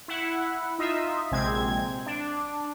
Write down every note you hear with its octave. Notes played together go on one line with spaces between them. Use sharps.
E4 F#5
D#4 F4 D#5 E5
A#1 C3 G#3 C4 G#6
D4